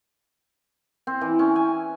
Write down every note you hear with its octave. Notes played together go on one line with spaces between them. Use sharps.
C4
E3
C#4
G#5